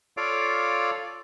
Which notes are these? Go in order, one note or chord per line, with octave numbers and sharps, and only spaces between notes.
F4 A4 C#5 D5 F5 D6